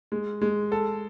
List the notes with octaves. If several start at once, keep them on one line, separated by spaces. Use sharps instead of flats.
G#3
G#3
A4